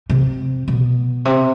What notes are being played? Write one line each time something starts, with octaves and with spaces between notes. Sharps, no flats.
C3
B2
C3